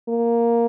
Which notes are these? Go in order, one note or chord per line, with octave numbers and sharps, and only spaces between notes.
A#3